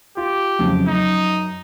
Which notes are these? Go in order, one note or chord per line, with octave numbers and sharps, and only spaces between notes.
F4 G4
F2 C#3 F#3
F#2 D#4